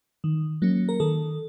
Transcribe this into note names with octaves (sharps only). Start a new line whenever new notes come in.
D#3
F#3 A#3 C#4
A#4
D#3 A4